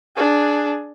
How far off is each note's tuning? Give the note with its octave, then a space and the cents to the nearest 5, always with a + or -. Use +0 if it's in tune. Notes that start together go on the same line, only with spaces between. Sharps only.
D4 +0 G#4 +20